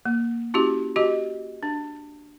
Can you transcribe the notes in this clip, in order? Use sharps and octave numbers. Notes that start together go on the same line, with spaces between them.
A#3
C#4 E4 F#4 G4
F#4 G4 D#5
D4